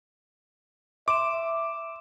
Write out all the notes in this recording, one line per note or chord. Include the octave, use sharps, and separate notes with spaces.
E5 C6 D6 E7